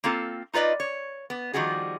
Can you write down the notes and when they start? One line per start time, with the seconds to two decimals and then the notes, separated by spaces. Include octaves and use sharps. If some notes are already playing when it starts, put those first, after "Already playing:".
0.04 A#3 C4 F4 A4
0.53 D#4 F4 B4 D5 D#5
0.80 C#5
1.30 B3
1.53 D#3 F3 G3 F#4 G#4